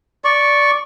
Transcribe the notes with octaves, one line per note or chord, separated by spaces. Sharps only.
D5 C#6